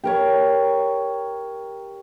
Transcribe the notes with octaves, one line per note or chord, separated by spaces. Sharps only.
G4 A#4 C#5